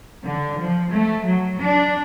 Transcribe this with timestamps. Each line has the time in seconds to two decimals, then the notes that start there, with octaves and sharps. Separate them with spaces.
0.23 D3
0.59 F3
0.92 A3
1.24 F#3
1.59 D4